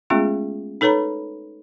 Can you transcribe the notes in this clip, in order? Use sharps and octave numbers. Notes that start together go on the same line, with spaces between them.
G#3 A3 B3 C#4 F4 G#4
D#4 A4 B4 C#5 A#5 B5